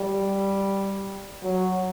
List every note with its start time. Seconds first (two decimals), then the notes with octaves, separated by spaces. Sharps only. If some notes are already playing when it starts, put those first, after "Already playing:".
Already playing: G3
1.43 F#3